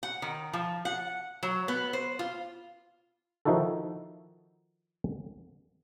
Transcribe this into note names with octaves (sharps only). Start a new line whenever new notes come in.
F#5
D#3
F3
F#5
F#3
B3
C5
F4
D#3 F3 D#4 E4 F#4 A4